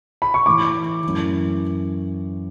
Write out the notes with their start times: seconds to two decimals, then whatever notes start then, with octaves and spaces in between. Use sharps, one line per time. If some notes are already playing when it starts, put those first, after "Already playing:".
0.22 B5
0.34 C#6
0.46 A2 E3 D6
1.03 F#2 E3